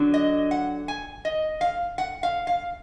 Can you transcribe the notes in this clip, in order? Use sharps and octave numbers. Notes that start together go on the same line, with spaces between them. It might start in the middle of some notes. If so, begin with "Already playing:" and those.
Already playing: D3 F#3 D4
D#5
F#5
G#5
D#5
F5
F#5
F5
F5